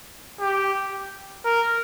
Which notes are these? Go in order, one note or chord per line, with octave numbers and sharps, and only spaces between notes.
G4
A#4